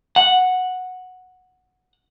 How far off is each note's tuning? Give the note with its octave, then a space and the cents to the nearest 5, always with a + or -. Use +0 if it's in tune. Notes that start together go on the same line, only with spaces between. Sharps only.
F#5 -5